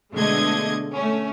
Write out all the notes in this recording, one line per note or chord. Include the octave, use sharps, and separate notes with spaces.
B2 D3 G#3 A3 D#5 G#6
A3 C#4